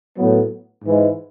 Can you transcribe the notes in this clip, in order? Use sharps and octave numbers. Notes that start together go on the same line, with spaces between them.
A2 F#3 B3
G#2 E3 G#3